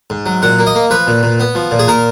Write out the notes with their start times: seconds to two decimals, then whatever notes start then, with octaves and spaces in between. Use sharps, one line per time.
0.10 G#2
0.26 F#3
0.42 A#2 F#5
0.59 A#3
0.66 D#5
0.75 A#3
0.90 F3 B4
1.07 A#2
1.23 A#2
1.40 B3
1.55 F3
1.71 A#2
1.79 G#4
1.87 A#2 A#4